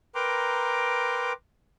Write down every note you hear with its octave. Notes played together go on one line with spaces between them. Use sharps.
A#4 B4 G5 A#5 C6 D6